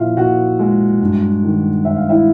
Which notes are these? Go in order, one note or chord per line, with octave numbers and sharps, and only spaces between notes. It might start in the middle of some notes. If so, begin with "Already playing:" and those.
Already playing: A#2 F3 E4 F4 E5 F5
A#2 F#4 F#5
G#3
G2
D#3
G2 E5
F5
E4 E5